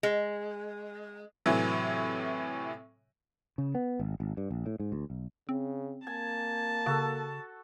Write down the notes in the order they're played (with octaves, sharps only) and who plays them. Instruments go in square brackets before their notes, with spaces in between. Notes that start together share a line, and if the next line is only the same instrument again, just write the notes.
[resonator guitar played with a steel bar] G#3
[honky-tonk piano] A2 C3 E3 F#3
[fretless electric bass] C#3
B3
G#1
G#1
G2
A#1
A2
G#2
D2
B1
[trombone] C#3 [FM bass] C4
[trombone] A#3 [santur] G#5 [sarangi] A5
[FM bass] C#3 [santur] F#4 A4 E6